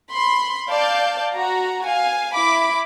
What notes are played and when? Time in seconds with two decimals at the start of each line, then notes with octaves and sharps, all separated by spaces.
0.11 B5 C6
0.69 D5 F5 A5 G6
1.35 F#4 A#5
1.85 F5 G#5
2.35 E4 B5 D6